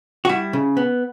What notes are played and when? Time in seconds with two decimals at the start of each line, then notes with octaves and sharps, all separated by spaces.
0.25 F#4
0.29 G3 E4
0.53 C#3
0.77 B3